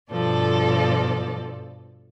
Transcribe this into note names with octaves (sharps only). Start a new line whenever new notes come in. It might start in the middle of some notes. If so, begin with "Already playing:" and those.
G2 B2 F3 A4 D5